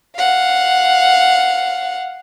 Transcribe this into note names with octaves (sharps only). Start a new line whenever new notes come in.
F5 F#5